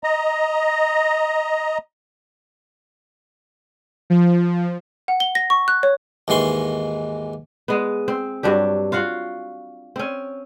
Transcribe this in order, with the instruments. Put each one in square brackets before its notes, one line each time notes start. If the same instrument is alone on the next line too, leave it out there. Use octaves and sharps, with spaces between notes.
[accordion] D#5 A#5
[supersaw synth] F3
[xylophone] F#5
G7
A#6
C#6
F#6
C#5
[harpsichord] D#2 G#2 E3 C6 C#6
[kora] G#3 B3
C4
G2 F#3 D4 G4
F4 F#4 F5 F#5
C4 C#4